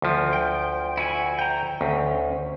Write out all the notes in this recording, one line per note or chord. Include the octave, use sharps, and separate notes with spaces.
D2 F3
G5
E4 F#4 G#5
G5 A#5
D2 C#4